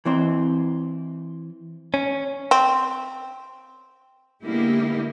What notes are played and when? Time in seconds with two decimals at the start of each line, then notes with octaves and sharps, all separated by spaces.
0.05 E3 C4 C5
1.94 C#4
2.51 C4
4.44 D3 G#3 A#3 B3 E4 G4